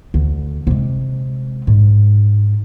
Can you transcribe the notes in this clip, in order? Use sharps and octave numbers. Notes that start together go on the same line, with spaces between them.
D2
C3 G#3
G#2